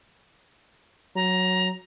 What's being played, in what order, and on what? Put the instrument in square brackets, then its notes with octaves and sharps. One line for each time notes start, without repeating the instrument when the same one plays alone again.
[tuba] F#3 [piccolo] A#5